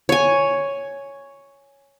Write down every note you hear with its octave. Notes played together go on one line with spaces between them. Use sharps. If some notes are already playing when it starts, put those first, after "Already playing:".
C#5 G#5